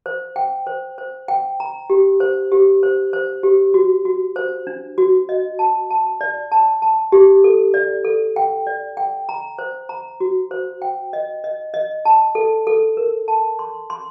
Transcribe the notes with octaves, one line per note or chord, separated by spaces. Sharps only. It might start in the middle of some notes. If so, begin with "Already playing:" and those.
C5
G5
C5
C5
G5
A#5
G4
C5
G4
C5
C5
G4
F#4
F#4
C5
D4
F#4
D#5
A5
A5
D5
A5
A5
G4
A4
D5
A4
G5
D5
G5
A#5
C5
A#5
F#4
C5
G5
D#5
D#5
D#5
A5
A4
A4
A#4
A5
C6
C6